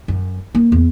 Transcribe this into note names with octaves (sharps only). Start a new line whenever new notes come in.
F#2
A#3
E2